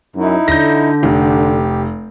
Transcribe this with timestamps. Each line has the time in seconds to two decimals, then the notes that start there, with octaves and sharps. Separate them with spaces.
0.16 F#2 D#4 E4
0.48 D3 G6 A#6
1.03 F1 G4